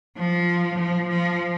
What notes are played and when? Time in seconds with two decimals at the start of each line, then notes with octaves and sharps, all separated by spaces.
0.17 F3
0.79 F3
1.09 F3